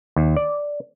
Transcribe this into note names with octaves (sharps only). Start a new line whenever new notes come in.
D#2
D5